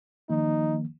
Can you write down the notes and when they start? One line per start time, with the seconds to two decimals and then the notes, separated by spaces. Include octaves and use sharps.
0.30 D#3 F3 A#3 D#4